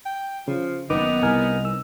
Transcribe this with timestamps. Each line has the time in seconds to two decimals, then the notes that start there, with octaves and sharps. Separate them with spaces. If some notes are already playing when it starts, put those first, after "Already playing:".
0.06 G5
0.48 C#3 F3
0.90 F#1 D#3 B3 D#4 D6
1.23 C2 A#4 G#5 F6
1.65 E6